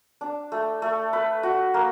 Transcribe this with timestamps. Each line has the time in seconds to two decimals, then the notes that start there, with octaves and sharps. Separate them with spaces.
0.21 D4
0.52 A3
0.82 A3
1.13 B4
1.43 F#4
1.74 A#3